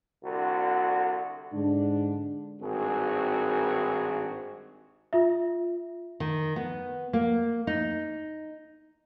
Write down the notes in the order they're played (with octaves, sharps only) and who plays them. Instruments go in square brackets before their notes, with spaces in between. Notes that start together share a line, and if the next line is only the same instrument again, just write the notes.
[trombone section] C2 D3 F#4
[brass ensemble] G#2 D3 D4
[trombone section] G#1 G2 D#3 C4 F#4 G#4
[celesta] F4 E5
[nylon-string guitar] D#3
B3
A#3
D#4